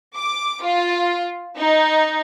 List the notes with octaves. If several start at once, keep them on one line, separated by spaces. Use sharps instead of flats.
D6
F4
D#4